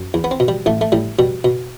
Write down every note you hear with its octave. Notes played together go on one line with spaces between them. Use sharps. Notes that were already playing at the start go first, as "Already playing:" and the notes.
Already playing: F#2
E2
B3
C4
B2
G3
A1 A3
A3
A2 G3
B2 G3
B2